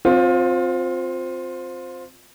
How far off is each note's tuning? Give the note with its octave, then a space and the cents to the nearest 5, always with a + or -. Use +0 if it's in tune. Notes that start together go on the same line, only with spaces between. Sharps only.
C4 +0 F4 +25 C#5 -45